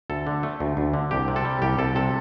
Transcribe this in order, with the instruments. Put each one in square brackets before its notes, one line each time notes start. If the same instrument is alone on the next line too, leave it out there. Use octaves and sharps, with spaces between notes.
[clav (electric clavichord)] D2 A4
D3
A3
D2
D2
D3
C2 G4
C3
A4
G3
C2 G4
C2 A4
C3 A4